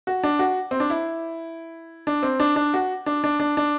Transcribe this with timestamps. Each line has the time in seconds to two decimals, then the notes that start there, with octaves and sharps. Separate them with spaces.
0.07 F#4
0.23 D4
0.39 F#4
0.71 C4
0.80 D4
0.90 E4
2.07 D4
2.23 C4
2.40 D4
2.56 D4
2.74 F#4
3.06 D4
3.24 D4
3.40 D4
3.57 D4